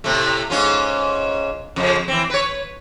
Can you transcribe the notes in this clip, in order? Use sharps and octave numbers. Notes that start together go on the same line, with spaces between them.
A2 C3 A3
G#2 C#4 F4
F2 C#3 F3
E3 C4
B4 C#5